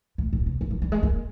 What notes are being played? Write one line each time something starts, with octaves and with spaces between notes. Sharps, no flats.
A2
A#2
B2
E3
F#3
G3
G#3
A#3